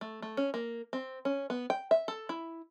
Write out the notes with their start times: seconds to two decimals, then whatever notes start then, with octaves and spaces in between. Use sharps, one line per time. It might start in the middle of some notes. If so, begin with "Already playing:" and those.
0.01 A3
0.22 A3
0.37 C#4
0.54 A#3
0.93 C4
1.25 C#4
1.50 B3
1.70 G5
1.91 E5
2.08 A4
2.29 E4